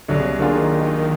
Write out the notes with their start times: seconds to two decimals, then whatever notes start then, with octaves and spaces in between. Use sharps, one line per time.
0.08 C2 B2 D3 F#3
0.19 C#3
0.29 C#3
0.39 D3 F#3 A#3 D4 F4 G#4
0.54 D#3